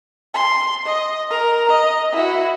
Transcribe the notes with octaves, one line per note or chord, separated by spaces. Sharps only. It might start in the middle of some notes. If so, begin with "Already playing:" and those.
C6
D#5
A#4 A#5
D#5
E4 F#4